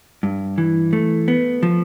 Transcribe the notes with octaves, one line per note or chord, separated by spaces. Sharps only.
G2
E3
A3
B3
F3